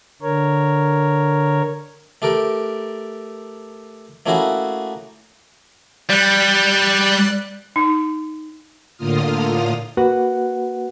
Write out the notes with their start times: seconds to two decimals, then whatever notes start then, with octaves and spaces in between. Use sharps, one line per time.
0.22 D3 A#4 C#5
2.22 A3 G4 A4 A#4
4.26 A3 A#3 C#4 E4 F#4 G#4
6.10 G3 D5 F#6
7.76 D#4
8.97 A2 D3 A#3 F4 D#6 F6
9.97 A#3 F#4 B4 F#5